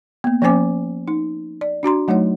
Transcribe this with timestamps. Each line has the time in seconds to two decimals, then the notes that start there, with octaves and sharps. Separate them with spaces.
0.24 A#3 B3
0.42 F3 A#3 C#4 C5 G#5 D6
1.08 D#4
1.61 D5
1.83 D4 F#4 A#5 C6
2.08 F#3 A3 D#4 C#5 F#5